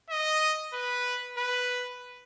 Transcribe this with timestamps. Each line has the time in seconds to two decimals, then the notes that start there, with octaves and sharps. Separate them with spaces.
0.10 D#5
0.74 B4
1.38 B4